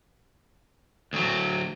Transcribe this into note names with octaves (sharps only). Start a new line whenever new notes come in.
D2 F#3